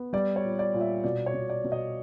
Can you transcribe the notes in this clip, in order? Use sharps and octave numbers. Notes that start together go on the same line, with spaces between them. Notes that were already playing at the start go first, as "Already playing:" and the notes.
Already playing: B3
G3 D5
C#5
A#2
D5
A#2
E5
B2 D5
C#5
B2
D5
B2
D#5